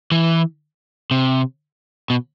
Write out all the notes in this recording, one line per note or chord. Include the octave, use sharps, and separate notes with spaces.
E3
C3
B2